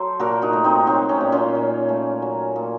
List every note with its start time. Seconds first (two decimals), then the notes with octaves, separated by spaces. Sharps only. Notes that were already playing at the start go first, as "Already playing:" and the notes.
Already playing: F#3 A4 C5
0.19 A#2 F#4 A#4
0.42 D#4 F#4
0.53 A3
0.64 C4 D#4
0.87 F#3 C4
1.09 C#4
1.21 A#2
1.32 C#4 F4
1.55 A#2
1.89 A3
2.22 F#3
2.56 A#2